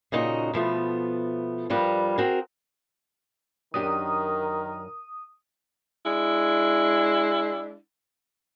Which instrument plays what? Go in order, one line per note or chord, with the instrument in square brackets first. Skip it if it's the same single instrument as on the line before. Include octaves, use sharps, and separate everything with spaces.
[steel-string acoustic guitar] A#2 C#3 D#4 F#4 D#5
B2 F3 A3 B3
G2 F3 G3 A#4 B4
C4 F#4 G#4 A#4
[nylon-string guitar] F#2 D4 G4 [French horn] D#3 [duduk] A#4 [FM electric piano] D#6
[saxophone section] G#3 D4 E4